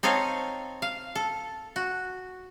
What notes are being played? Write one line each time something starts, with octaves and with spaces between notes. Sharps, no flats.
C4 D#4 A4 C#5 F5
F5
A4
F#4